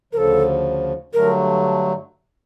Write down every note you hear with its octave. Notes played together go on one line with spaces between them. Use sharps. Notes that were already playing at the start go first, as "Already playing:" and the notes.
D2 C#3 F3 A4 A#4
G2 D3 F#3 A3 A#4